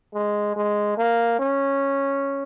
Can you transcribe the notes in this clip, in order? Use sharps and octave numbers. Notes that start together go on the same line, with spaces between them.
G#3
G#3
A#3
C#4